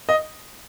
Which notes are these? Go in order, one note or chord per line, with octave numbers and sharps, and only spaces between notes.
D#5